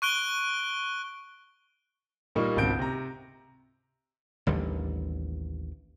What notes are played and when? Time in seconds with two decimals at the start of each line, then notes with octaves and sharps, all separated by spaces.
0.02 C#6 F#6 D7 G7
2.35 A#2 G3 A#3 D#4 C#6
2.56 G#1 C#2 B2 C4 G6 D7
2.79 C3 A#5
4.47 A1 D#2 D3 G3